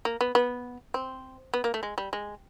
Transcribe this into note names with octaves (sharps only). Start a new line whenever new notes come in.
A#3
B3
B3
C4
B3
A#3
A3
G#3
G3
G#3